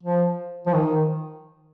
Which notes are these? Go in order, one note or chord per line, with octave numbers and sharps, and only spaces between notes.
F3
F3
D#3